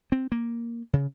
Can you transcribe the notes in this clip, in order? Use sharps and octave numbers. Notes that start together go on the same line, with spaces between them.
C4
A#3
C#3